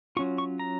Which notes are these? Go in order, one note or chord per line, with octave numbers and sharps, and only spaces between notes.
F#3 C#4 F4 C#6
C#6
A#5